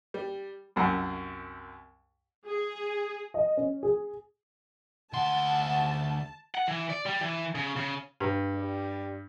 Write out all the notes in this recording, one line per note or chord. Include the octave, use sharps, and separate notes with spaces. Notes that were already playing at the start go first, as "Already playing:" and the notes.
G3
C2 F#2
G#4
D#5
C#4
G#4
D2 F#5 A5 C6
F#5
E3
D5
G3
E3
C#3
C#3
G2
G3